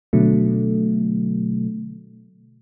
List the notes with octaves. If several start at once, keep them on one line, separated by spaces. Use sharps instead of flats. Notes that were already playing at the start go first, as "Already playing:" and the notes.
B2 D3 F#3 A3